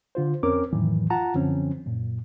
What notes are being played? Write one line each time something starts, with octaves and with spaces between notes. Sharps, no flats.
D3 F4 C5
F2 C4 C#4 A#4 C#5 D6
F2 A2 D#3 E3 F#3
F4 F#5 A5 A#5
F#2 D3 F3 C4 C#4
F#2 A#2